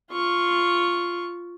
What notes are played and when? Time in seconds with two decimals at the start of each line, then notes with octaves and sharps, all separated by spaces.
0.12 F4 C#6